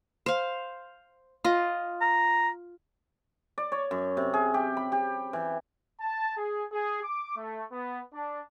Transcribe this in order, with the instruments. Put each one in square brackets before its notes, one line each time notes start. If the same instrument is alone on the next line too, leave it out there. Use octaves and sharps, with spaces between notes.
[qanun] C5 F5
F4 D#5
[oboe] A#5
[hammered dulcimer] D5
C#5
F#2
C3
G#4
G4
B5
G4
E3
[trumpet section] A5
G#4
G#4
D6
A3
B3
D4